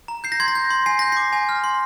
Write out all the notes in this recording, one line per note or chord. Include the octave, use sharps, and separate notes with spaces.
A#5
G6 C7
A#6
C6 G#6
A#6
G6
C6
G#5 C7
G6 A#6
D6 C7
G#5
F6
C6